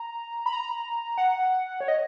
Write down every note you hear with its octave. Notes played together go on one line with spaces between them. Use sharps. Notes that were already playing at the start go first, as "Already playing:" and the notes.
Already playing: A#5
B5
A#5
F#5
C#5
D#5